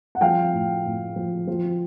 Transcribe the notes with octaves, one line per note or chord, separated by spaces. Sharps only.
F#5
F3 F5 G5
A2
A2
F3
F3